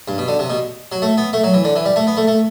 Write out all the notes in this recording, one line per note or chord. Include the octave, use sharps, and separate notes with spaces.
G2
B2
D3
C3
B2
F#3
A3
B3
A3
F#3
E3
D3
E3
G3
A3
B3
A3
A3